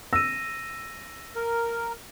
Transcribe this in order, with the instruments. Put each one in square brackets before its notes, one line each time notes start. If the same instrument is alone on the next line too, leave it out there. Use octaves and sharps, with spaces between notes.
[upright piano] E6 [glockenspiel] A#6 D#7
[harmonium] A#4